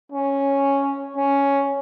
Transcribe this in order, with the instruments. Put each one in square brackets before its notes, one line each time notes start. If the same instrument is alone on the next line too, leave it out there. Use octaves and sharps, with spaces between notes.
[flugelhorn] C#4
C#4